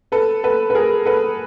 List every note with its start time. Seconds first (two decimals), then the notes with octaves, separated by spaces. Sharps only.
0.12 A4 B4
0.44 A4 B4
0.70 B4
0.75 G#4 A#4
1.05 A4 B4